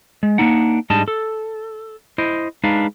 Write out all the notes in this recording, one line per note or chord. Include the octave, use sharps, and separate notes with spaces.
G#3
A#3 B3 D4 D#4 F#5
G#2 G3 G#3 D4 D#5 A5
A4
E4 C5 D#5
G#3 D4 D#4 B4 F5